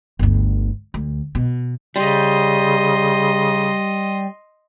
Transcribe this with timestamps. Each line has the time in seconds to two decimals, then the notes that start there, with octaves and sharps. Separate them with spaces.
0.19 G1 D2
0.94 D2
1.35 B2
1.96 C#3 G3 D#5 C6